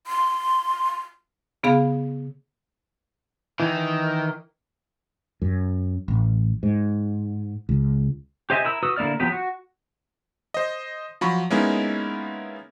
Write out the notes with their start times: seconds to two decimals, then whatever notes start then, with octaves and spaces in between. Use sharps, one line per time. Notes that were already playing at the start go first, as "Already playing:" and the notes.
0.07 C6
1.63 C#3 B3 G#4 F5 B5
3.60 D#3 E3 E4
5.42 F#2
6.08 A1
6.63 G#2
7.69 C#2
8.50 G4 C5 D#5 E5 G#5
8.65 E4 A#4 E6
8.83 F#4 B4 D#6 E6
8.96 D3 A#3 E4 D5 F6
9.20 F3 F#3 B3 G4 B4
9.32 F#4
10.54 C5 D#5
11.21 F3 F#3 B5 C#6
11.50 G#3 A#3 B3 C#4 D#4 E4